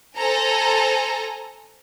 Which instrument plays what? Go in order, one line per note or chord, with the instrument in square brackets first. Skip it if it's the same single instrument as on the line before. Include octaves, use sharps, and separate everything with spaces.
[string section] A4 C5 G#5 A#5